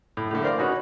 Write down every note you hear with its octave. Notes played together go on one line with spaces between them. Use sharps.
A2
A2 D3 A3
A#4 C5 D5 F5 D6
C#4 D#4 F#4 B4 C#5